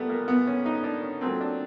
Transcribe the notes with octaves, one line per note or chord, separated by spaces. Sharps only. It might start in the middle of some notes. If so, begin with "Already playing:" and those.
Already playing: A#2 G3 A3 B3
A#3
B3
C#4
D#4
D4
C#4
A#2 F#3 A3 C4
D4